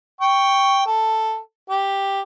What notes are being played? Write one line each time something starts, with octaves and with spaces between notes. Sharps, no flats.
G5 C#6
A4
G4